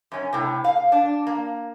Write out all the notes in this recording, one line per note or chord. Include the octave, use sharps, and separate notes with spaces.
F#2 C#4
A2 C3
F5
D4
A#3